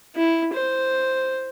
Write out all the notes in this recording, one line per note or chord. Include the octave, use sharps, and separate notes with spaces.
E4
C5